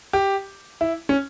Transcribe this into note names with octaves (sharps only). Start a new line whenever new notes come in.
G4
E4
C#4